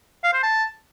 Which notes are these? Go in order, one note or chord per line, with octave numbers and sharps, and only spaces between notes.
F5
C5
A5